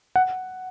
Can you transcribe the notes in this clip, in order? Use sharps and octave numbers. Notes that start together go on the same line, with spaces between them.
F#5